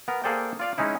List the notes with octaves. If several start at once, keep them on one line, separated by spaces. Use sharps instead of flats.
B3 A#4
A#3 G#4 A4 C5 D5 G5
F4 D5 F5
G#3 C#4 D#4 E4